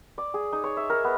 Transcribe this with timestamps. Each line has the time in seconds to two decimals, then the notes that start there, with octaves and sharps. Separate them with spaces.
0.18 D5
0.34 G#4
0.53 D#4
0.64 C#5
0.77 E5
0.90 A#4
1.04 B3